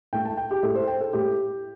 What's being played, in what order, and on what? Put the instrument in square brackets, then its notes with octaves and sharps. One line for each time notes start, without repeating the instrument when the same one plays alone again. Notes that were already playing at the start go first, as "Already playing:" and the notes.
[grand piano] A2 A3 G5
A5
G5
G4
A2 A3 A4
C5
G5
A4
A2 A3 G4